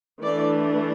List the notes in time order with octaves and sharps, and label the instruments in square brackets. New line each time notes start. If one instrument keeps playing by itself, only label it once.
[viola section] E3 A3 D4 D5